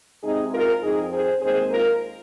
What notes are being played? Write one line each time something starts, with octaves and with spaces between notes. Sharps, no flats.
C3 G#3 C4 D#4 G#4
F4 A#4
F2 F3 C4 D#4 G#4
G#4 C5
D#2 D#3 G#3 C4 G#4 C5
F4 A#4